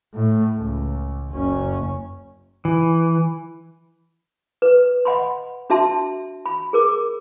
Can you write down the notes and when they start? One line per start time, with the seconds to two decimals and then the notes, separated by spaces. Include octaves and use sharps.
0.14 A2
0.58 C#2
1.31 F#1 C#4
2.65 E3
4.62 B4
5.05 D#5 F#5 B5 C6
5.70 D4 F#4 E5 A5 C6
6.46 B5
6.73 G#4 A#4 D6